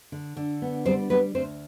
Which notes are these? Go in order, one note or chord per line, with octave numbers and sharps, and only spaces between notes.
D3
D3
B3
G3 C4 C5
G3 B3 B4
D2 C4 C5